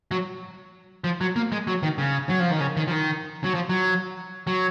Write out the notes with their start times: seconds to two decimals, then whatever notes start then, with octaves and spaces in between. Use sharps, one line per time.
0.11 F#3
1.04 F3
1.21 F#3
1.36 A#3
1.52 G#3
1.67 F#3
1.83 D#3
1.98 C#3
2.29 F#3
2.40 F3
2.51 D#3
2.61 C#3
2.77 D#3
2.88 F3
2.91 D#3
3.44 F#3
3.55 F3
3.70 F#3
4.47 F#3